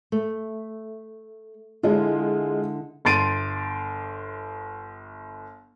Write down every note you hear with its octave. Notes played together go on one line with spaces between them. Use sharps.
A3
D3 G#3 E4 F4
G1 C6 A6 D7 D#7